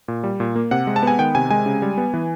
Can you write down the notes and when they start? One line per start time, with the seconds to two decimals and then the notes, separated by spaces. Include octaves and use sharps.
0.08 A#2
0.24 G3
0.40 A#2
0.56 A#3
0.71 C3 F#5
0.87 G#3
0.96 A5
1.03 B3 G#5
1.18 D#3 G5
1.35 C3 G#5
1.50 G#3 G#5
1.66 C#3
1.82 G3
1.98 B3
2.14 E3